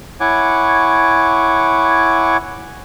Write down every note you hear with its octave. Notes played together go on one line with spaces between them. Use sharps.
E4 C#5 F#5 G#5 C#6 D6